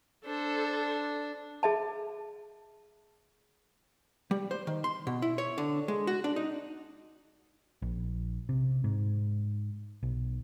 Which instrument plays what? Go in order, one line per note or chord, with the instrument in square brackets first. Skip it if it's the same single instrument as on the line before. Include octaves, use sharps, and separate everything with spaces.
[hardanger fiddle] D4 [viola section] A4 C5
[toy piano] G#4 E5 A5
[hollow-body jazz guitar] G3
C5
D#3
C6
B2
E4
C#5
D3
G#3
F#4
D4
D#4
[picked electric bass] A#1
C3
G#2
B1